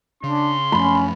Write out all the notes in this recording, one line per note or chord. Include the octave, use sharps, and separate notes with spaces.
C#3 D4 C6
F#2 F3 A3 C#4 B5